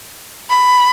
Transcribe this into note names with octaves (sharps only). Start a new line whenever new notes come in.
B5